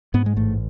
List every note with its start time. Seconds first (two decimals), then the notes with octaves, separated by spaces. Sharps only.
0.14 G#2 B3
0.26 G#3
0.36 A1 A3